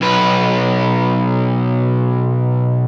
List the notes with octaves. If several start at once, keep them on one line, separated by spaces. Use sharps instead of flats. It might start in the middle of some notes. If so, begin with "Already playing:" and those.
B1 B4